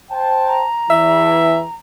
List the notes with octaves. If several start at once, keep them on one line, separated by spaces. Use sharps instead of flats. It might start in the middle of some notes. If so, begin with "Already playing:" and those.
C5 G5 A5
A#5
E2 E3 E5